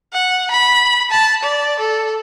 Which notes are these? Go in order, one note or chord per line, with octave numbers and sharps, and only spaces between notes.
F#5
B5
A5
D5
A4